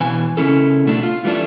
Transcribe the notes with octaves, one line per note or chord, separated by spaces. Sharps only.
B2 E3 G#5
C#3 C#4 E4 A4
B2 A3 D4
F4
E3 G3 A3 D4